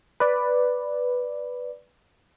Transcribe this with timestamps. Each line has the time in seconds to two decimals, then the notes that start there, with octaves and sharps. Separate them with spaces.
0.20 B4 D5